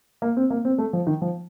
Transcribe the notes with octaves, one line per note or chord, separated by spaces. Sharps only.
A#3
C4
A#3
C4
A3
F3
D#3
F3